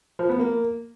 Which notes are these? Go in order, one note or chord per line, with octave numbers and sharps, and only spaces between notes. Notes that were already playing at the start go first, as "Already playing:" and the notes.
F3
B3
A#3